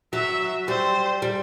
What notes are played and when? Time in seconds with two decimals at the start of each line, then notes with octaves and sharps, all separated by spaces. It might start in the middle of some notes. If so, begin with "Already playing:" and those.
0.13 F#3 E5
0.68 G3 C5
1.22 G3